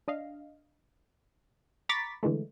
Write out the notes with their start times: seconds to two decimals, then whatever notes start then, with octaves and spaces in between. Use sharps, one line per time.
0.08 D4 D#5 F5
1.89 A#5 B5 C#6 D6 A6 B6
2.23 D3 E3 G#3 A3